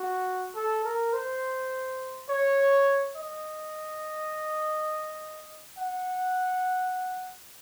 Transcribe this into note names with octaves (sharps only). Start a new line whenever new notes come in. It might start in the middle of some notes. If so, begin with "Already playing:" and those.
Already playing: F#4
A4
A#4
C5
C#5
D#5
F#5